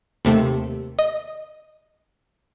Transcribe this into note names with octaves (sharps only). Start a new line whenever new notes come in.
D#2 C3 A3
D#5